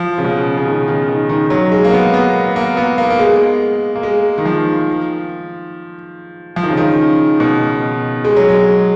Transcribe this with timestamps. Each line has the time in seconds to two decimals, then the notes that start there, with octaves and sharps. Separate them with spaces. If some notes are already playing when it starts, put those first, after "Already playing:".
Already playing: F3
0.18 C#3
0.24 B2
0.57 C#3
0.67 D#3
0.88 D#3
1.09 D#3
1.29 D#3
1.50 F#3
1.72 G#3
1.84 A#3
1.93 B3
2.14 B3
2.56 A#3
2.77 B3
2.98 A#3
3.10 A#3
3.19 G#3
3.96 A#3
4.03 G#3
4.38 D#3
4.45 F3
6.56 F3
6.63 D#3
6.70 C#3
6.77 D#3
7.40 B2
8.25 G#3
8.37 F#3
8.49 G#3